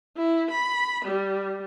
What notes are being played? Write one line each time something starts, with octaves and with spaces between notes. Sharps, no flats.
E4
B5
G3